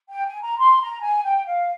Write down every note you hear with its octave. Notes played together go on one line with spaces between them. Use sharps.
G5
G#5
A#5
C6
A#5
G#5
G5
F5